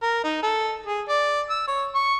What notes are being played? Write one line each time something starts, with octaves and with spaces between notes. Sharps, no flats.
A#4
D#4
A4
G#4
D5
E6
C#5
C#6